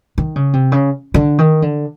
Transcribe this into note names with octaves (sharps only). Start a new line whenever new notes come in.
D#3
C#3
C3
C#3
D3
D#3
D3